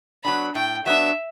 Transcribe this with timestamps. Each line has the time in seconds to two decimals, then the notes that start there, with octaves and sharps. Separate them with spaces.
0.24 F#3 B3 D4 B5
0.55 A2 G5
0.86 F#3 B3 D4 E5